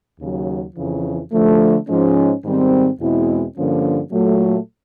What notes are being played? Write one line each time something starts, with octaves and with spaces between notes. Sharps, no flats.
D#2 C#3 F#3
F2 C#3 E3
D3 F3 A3
G#2 F3 G#3 C#4
G#2 D#3 G3 C4
E2 B2 G#3 C4 E4
G2 D3 F3 A#3 C#4
A#2 F#3 A3